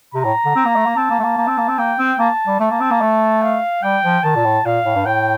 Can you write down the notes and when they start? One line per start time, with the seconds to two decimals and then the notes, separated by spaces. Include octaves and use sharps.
0.14 C3 A#5
0.25 A2
0.45 D3
0.56 C4
0.65 A#3
0.76 A3
0.86 A#3
0.97 C4 A5
1.10 A#3
1.19 A3
1.24 A#3
1.37 A#3
1.48 C4
1.58 A#3
1.69 C4
1.78 A#3 G5
1.99 C4
2.19 A#3 A5
2.47 G3
2.60 A3 A5
2.70 A#3
2.80 C4
2.91 A#3
3.01 A3
3.42 F5
3.83 G3 G5
4.04 F3
4.23 D#3 A5
4.36 A#2
4.44 A2
4.65 A#2 F5
4.85 A2
4.96 G2
5.05 A2 G5